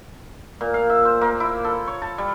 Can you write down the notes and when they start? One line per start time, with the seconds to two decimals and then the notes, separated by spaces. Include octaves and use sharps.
0.61 A#2
0.74 F5
0.90 E5
1.05 C5
1.21 A#3
1.40 E4
1.64 A4
1.87 C#5
2.02 A5
2.18 G3